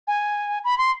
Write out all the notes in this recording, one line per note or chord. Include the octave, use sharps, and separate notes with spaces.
G#5
B5
C6